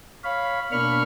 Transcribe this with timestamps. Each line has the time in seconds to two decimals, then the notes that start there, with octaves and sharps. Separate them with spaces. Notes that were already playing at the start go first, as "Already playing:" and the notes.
0.24 C#5 F5 B5
0.72 B2 A#3 D4 B5 C#6 F6